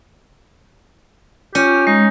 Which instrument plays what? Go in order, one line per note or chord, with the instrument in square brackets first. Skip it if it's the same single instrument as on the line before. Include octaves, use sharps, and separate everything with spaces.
[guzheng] C#4 [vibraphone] F4 [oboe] G4
[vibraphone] G#3 [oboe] D#4